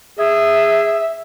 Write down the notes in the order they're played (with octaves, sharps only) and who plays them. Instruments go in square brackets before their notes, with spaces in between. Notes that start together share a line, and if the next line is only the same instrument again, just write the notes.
[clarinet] G#4 [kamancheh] E5